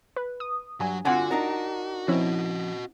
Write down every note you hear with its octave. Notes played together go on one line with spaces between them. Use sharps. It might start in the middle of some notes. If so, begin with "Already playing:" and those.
B4
D#6
G2 F#3 G#5
D3 C4 F4 F#4 F#5 G#5
D4 D#4 A#4
F3 C4 C#4 E4 F#4 D#5